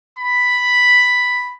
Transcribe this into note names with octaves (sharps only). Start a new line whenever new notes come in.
B5